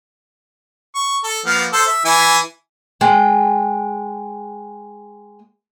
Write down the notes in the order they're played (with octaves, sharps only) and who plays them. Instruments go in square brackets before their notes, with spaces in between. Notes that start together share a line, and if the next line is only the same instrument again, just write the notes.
[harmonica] C#6
A4
F3 A#3 B3
A4 C5 E6
E5
E3 E4 G#5
[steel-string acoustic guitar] G#3 G5